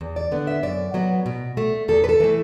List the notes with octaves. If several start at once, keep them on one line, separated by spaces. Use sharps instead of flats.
E2
D5
D3 B3
E5
F#2 D5
F#3 B3
B2
A3
E2 A4
B4
A4
E3 A3